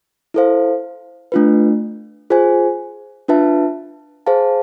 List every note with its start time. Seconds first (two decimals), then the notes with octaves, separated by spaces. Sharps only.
0.34 E4 A4 C5 F5
1.32 A3 D4 F4 B4
2.30 F4 G#4 C5 G#5
3.28 D4 F4 B4 E5 A5
4.27 G#4 C5 F5 A5